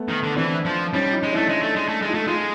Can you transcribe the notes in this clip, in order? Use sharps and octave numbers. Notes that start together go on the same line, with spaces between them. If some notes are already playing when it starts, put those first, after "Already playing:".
Already playing: A3 B3
D#3
D3
E3 C4 D4
F3
G3 C#4 D#4
D#4 F4
G#3
A3 D4 E4
G#3
A3
G#3
A3
G#3
D#4 F4
A3
G#3 D#4 F4